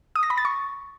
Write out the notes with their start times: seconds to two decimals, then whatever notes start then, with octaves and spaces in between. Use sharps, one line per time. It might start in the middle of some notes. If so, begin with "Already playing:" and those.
0.16 D#6
0.23 A#6
0.30 B5
0.38 A6
0.45 C#6